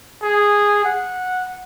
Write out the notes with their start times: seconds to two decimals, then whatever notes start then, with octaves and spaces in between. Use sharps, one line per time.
0.23 G#4
0.85 F#5